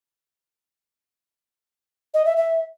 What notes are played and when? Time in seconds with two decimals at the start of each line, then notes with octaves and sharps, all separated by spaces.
2.14 D#5
2.25 E5
2.37 E5